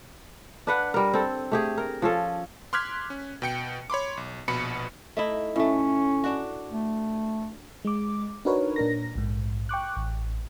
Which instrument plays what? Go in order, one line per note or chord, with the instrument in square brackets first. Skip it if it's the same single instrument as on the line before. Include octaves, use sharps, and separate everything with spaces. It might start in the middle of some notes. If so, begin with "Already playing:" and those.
[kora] D4 B4 F#5
G3 A#4
C4 A4
A3 G4 G#4
A#4
F3 C#4 A4
[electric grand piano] C6 D6 F6 F#6 G#6 B6
C#4
B2 G5 C#7
C#5 B5 C6 D6
B1
A#1 B2 B5 C#7
[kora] A3 D#4 E4
[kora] A2 A3 [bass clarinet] C#4
[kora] D4 F#4
[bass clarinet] A3
[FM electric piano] G#3 D6
D4 D#4 F#4 A#4 B4 C#5
A#2 D4 A#4 A#6
A#1 G#2
G5 C#6 D6 F#6
A1